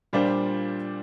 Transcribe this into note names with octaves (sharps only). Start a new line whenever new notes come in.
A#2 G3 D4 F4 C5